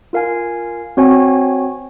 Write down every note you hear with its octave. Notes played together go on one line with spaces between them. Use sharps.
F4 A#4 F5 G#5
C4 F#4 C#5 G#5